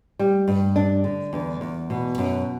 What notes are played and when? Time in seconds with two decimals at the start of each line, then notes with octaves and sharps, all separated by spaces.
0.19 G3
0.48 G2
0.76 D4
1.04 D3
1.33 E2
1.61 E2
1.90 B2
2.18 F#2